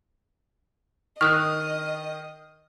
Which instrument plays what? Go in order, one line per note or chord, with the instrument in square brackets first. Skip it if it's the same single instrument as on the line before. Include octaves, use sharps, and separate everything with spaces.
[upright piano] D#3 [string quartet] D#5 [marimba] C#6 D#6 F#6 [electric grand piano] F6